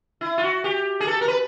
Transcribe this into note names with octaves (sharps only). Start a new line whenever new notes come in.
E4
F4
F#4
G4
G#4
A4
A#4
B4